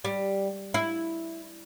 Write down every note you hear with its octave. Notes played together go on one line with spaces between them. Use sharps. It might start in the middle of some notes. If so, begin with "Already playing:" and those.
G3
E4